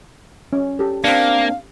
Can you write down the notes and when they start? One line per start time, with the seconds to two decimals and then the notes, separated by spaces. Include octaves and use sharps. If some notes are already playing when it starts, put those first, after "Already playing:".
0.53 C#4
0.79 G4 A4
1.04 A#3 C4 D4 F5